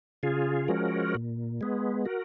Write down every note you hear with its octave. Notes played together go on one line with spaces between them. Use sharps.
C#3 F4 G#4
F3 G#3 C#4 F#4 A#4
A#2
G#3 B3
F#4 A#4